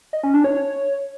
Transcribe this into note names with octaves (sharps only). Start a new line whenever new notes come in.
D#5
C#4
D4
C#5